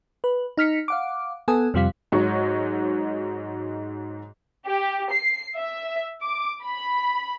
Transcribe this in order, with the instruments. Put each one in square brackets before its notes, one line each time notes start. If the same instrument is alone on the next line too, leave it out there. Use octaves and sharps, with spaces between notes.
[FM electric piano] B4
D#4 F6 B6 C#7
F5 F#5 D6
B3 A4 G#5 D#6
F2 C3 F3 G3 F5 B6
[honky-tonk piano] G#2 F#3 D#4 F#4 C#5 C#6
[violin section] G4
C7
E5
D6
B5